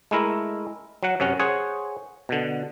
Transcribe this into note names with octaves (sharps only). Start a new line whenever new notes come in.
G#3 A3 E4 A#4
F#3 F#5
F#2 C3 C#4 F#5
G#4 C5 C#5 F#5
B2 D3